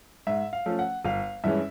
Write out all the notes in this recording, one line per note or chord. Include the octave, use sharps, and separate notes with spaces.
G#2 E5
F5
F3 A3 C#4
F#5
G1 F5
G2 E3 G#3 C#4 E5